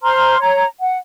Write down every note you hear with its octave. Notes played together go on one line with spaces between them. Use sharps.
C5 A#5 C6 F6
C#5 A#5
F#5